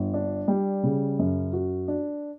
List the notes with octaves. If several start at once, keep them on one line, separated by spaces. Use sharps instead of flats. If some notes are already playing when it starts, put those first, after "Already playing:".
Already playing: G1
D4
G3
C#3
F#2
F#4
D4